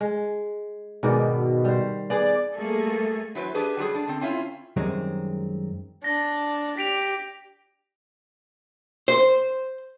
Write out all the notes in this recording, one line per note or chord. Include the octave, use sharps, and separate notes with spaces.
G#3
G#2 B2 D#3 D5
G3 C5
B3 G#4 D5
G3 A3 A#3 G#4 A4
E3 F#3 B4 C5
D4 G4 G#4 B4
F#3 G3 F4 G#4
D4
D3 C4
C4 C#4 E4 F4
F#2 D#3 G3 G#3 C4
D4 A#6
G4 B6 D7 F7
C5